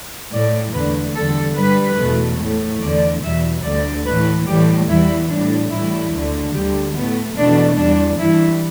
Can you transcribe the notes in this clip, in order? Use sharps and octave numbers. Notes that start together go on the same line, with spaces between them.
A2 A3 D5
E2 D3 A3 B4
E2 D3 G3 A4
G2 G3 B4
E2 B2 A3
A2 A3
E2 D3 A3 D5
E2 B2 G3 E5
D2 D3 G3 D5
A2 E3 A3 B4
A2 E3 G3 G4
E2 E3 G3 E4
A2 G3 D4
A2 E3 G3 E4
D2 D3 A3
D2 D3 G3 G4
A2 A3 B3
E2 B2 A3 D4
E2 E3 G3 D4
G2 E3 G3 E4